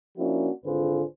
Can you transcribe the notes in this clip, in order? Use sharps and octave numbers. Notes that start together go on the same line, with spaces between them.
F3 A#3 C#4 D4 E4 F#4
G#1 D3 F4 G#4 B4 C5